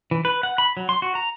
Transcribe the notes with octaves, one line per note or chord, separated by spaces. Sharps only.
E3
B4
F#5
B5
F#3
C6
F#4
A#5